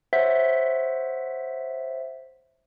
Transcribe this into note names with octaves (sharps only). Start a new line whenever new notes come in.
C5 C#5 E5 F#5 B6